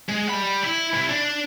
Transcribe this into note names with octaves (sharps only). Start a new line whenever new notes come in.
G#3
G3 B5
E4
C3 E4
D4